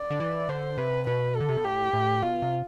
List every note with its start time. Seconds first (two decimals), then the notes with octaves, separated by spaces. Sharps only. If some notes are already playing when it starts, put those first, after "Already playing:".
Already playing: D5
0.10 D3
0.20 E3
0.49 D3 C5
0.78 C3 B4
1.07 B2 B4
1.36 D3 A4
1.49 C3
1.57 B2
1.64 A2 G4
1.93 A2
2.22 B2 F4
2.42 C3